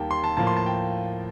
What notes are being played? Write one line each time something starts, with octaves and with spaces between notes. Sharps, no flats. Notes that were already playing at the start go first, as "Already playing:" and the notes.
Already playing: D#2 D#3 G3 A#3 G5 A5
C6
A5
A2 F3 A#3 A5
C6
A5
G5